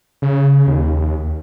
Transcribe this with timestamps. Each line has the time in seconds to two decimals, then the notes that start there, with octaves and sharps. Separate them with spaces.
0.22 C#3
0.67 D#2